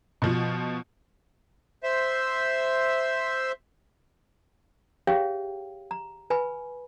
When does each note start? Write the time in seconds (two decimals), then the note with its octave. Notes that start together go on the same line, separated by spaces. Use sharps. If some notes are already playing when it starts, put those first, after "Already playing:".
0.22 B2 F3
1.83 C5 E5
5.07 G4 G#4 C#5 E5 F5 G5
5.91 A#5
6.30 B4 G#5 B5